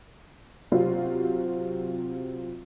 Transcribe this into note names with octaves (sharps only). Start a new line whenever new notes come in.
C3 F#3 C4 F4